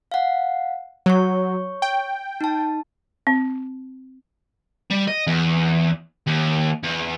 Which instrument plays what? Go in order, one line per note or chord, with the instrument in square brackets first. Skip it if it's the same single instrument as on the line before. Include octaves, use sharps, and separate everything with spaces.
[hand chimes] F5 F#5
[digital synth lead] F#3 [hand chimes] C#5 C#6
[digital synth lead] G5
[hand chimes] D#4 A5
[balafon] C4
[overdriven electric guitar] G3
D#5
E2
D#2
E2